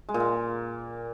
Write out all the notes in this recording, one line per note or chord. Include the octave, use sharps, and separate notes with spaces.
G#3
A#2
A#3